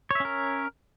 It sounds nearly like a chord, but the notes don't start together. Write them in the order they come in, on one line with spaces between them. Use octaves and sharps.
C#5 E5 C#4 A#4